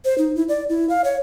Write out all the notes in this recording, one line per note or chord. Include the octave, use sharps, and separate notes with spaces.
C5
D#4
E4
D5
E4
F5
C#5